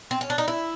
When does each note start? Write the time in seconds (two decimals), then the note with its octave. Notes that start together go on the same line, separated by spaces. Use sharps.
0.11 C4
0.21 C#4
0.30 D4
0.38 D#4
0.48 E4